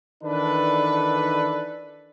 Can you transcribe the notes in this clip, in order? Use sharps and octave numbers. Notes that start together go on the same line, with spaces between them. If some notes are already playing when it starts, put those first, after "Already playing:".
D#3 E3 D4 A4 B4